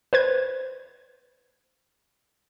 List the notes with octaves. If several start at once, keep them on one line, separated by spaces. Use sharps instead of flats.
B4 C5 G#6